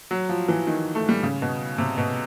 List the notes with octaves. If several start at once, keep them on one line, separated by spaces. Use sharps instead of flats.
F#3
F3
E3
D#3
A3
G3
C#3
B2
C3
B2